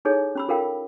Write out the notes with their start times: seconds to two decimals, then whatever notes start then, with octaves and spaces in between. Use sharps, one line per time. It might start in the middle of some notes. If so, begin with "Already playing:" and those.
0.05 D#4 E4 G#4 A4 C#5
0.35 C#4 B5 E6
0.48 F4 A4 A#4 F5 G5